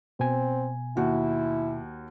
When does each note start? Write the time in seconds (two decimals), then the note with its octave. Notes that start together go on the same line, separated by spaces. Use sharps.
0.20 B2 C4 G#5
0.97 D#2 E4 F#4